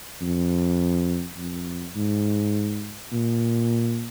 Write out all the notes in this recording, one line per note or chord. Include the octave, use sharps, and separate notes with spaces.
F2
F2
G#2
A#2